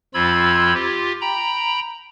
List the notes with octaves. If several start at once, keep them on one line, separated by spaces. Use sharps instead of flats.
F2 F3 F4 B5 E6 G#6
F4 G4
G5 A#5 B5